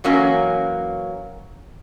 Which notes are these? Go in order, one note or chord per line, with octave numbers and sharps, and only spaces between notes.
E3 F#3 A#3 C#4